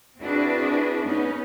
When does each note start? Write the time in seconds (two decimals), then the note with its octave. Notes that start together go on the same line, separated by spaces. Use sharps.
0.19 C4 D4 E4 F#4 G#4 B4
1.06 B3 C#4 D#4 B4